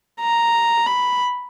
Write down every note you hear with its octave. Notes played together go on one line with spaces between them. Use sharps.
A#5
B5